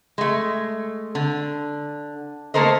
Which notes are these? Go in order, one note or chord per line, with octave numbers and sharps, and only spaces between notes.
G#3 A3
D3
A3 A#3 A4 A#4 C5 D#5